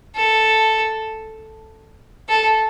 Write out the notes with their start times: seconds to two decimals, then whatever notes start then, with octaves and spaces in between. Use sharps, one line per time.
0.15 A4
2.29 A4